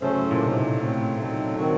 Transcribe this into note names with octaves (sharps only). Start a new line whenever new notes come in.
C#3 F#3 A3 C#4 A4 C5
A2
A#2
A2 C3 A3 D#4
A2 A3 C4
F#3 C4 D#4 A4
D#3 F#3 C4 F#4